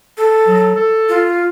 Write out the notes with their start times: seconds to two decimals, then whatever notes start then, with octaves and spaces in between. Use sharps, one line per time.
0.17 A4
0.47 F#3
0.76 A4
1.09 F4